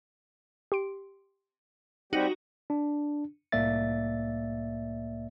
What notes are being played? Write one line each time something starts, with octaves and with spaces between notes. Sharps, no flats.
G4 C6 D7
G3 C4 D#4 F#4 G4
D4
C2 A2 A#3 D5 E5 A6